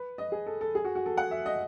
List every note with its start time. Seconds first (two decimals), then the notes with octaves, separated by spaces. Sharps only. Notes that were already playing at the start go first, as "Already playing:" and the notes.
Already playing: B4
0.18 D#5
0.32 G#4
0.46 A4
0.61 A4
0.75 G#4
0.85 F#4
0.95 F#4
1.06 A4
1.17 F#5
1.31 E5
1.46 D#5